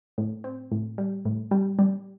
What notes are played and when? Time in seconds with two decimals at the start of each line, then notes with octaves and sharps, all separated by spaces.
0.18 A2
0.44 C4
0.72 A2
0.98 G3
1.25 A2
1.51 G3
1.79 G3